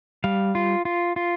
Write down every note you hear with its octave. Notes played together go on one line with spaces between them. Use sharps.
G3 F5
F4
F4
F4